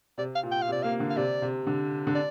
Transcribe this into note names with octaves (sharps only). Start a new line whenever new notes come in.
C3 D5
F5
A#2
G5
F5
C3
D5
A#3 F5
D3
F5
C3 D5
C3
D3
D3
D5